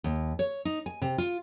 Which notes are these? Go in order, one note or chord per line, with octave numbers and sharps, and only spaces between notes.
D#2
C#5
D#4
G#5
C3
F4